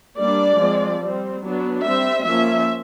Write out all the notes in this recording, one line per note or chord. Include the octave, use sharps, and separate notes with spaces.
G3 A#3 D4 D5
F3 G#3 C4
G3 C4
F#3 B3 D4
G3 C4 E5
F3 A#3 C#4 E5